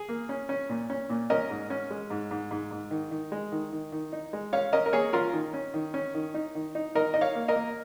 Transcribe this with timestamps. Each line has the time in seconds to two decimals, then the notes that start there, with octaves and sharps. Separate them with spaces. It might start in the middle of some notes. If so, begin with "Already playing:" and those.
Already playing: G#4
0.09 A#3
0.29 C#4
0.49 C#4
0.69 A#2
0.90 C#4
1.10 A#2
1.30 C#4 A#4 D#5
1.50 G#2
1.70 C#4
1.90 G#3
2.10 G#2
2.31 G#2
2.51 G#2
2.71 G#2
2.91 D#3
3.11 D#3
3.32 G#3
3.52 D#3
3.72 D#3
3.92 D#3
4.13 D#4
4.33 G#3
4.53 C#4 C#5 F5
4.73 C#4 A#4 D#5
4.86 A#4
4.93 A#3 G#4 C#5
5.13 C#4 F4 A#4
5.33 D#3
5.54 C#4
5.74 D#3
5.94 C#4
6.14 D#3
6.34 D#4
6.55 D#3
6.75 D#4
6.95 D#3 A#4 D#5
7.14 D#4 D#5
7.21 C#5 F5
7.35 A#3
7.48 A#4 D#5
7.56 A#3